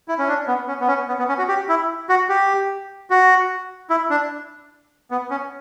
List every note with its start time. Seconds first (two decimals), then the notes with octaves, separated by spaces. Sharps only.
0.08 E4
0.19 C#4
0.28 D4
0.48 B3
0.68 C#4
0.81 B3
0.88 C#4
1.08 B3
1.19 B3
1.29 C#4
1.38 F#4
1.48 G4
1.69 E4
2.09 F#4
2.29 G4
3.10 F#4
3.90 E4
4.10 D4
5.11 B3
5.30 C#4